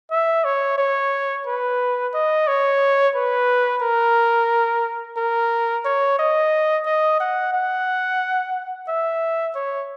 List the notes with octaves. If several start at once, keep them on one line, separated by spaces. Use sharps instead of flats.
E5
C#5
C#5
B4
D#5
C#5
B4
A#4
A#4
C#5
D#5
D#5
F#5
F#5
E5
C#5